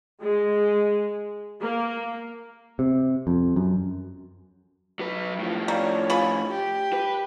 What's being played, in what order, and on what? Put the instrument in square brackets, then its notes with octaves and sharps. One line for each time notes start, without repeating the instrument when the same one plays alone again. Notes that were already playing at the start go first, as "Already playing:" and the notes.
[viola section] G#3
A#3
[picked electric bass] C3
F2
F#2
[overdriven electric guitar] F#3 B4
A2 F3
[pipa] G3 A#3 [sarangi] C#5
[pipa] F4 G#4 B5
[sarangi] G4
[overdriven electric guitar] B4